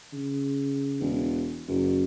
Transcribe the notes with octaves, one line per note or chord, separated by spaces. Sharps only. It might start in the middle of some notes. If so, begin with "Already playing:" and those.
C#3
E1
F#1 F#2